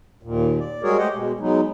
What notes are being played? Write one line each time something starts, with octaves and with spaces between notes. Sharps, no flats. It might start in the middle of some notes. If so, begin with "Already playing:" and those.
D#2 A#2
D5
G3 G#3 F#4 G#4 A#4 C#5
A3 G4 C5 D#5 F#5
B2 G#3
F#3 G#3 B3 D#4